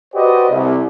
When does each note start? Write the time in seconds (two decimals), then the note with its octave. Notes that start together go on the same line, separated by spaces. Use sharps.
0.15 F#4 G4 B4 C5 D5 D#5
0.50 C2